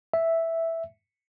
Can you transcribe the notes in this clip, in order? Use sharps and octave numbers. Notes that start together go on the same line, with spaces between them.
E5